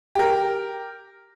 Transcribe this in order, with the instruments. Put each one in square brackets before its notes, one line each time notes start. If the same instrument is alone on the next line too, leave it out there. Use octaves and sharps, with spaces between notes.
[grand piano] G4 A#4